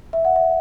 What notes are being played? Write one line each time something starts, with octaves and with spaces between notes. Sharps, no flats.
E5
F#5
E5